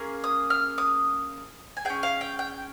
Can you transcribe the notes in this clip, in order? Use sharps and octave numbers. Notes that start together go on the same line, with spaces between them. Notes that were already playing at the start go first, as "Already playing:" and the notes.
Already playing: A#3 C#4 G#4
D#6
F6
D#6
G#5
C#4 G#4 G5
F5
G5
G5